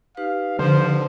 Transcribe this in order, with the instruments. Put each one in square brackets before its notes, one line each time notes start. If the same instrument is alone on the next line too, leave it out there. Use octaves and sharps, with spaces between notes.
[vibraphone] D#4 G4 B4 [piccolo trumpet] F5
[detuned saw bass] D3 [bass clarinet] F3 [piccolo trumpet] C5